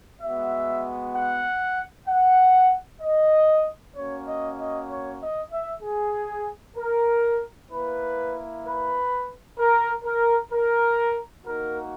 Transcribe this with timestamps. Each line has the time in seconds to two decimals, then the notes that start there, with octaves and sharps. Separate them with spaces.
0.19 G#3 B3 F#4 E5
1.13 F#5
2.07 F#5
3.00 D#5
3.94 A#3 C#4 F#4 C#5
4.25 D#5
4.57 D#5
4.88 C#5
5.19 D#5
5.50 E5
5.82 G#4
6.76 A#4
7.69 A#3 E4 B4
8.63 B4
9.57 A#4
10.03 A#4
10.51 A#4
11.44 A#3 D#4 F#4 A#4